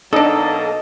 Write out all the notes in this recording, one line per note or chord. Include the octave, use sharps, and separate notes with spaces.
B2 F#3 A#3 D4 D#4 A4 D#5